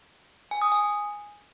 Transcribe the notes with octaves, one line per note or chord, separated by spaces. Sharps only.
G#5
D#6
G#5